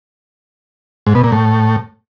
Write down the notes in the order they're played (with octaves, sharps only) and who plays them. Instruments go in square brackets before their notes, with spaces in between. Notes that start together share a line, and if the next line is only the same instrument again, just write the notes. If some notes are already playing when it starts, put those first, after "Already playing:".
[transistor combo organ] G#2
B2
A#2
A2